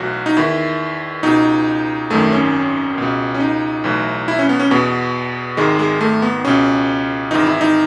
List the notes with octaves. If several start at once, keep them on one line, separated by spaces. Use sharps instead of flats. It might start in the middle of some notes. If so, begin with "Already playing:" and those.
Already playing: B1 A2 E3 F#4
D#4
E2 D#3 E4
C#2 B2 D#4
G#1 F#2 D#3 A3
C#4
C#2 B2
C#4
D#4
B1 A2 E3
E4
C#4
B3
C#4
E2 B2 B3
G#1 G#2 D#3 G#3
G#3
A3
B3
C#2 B2 C#4
G#1 G#2 E3 D#4
E4
D#4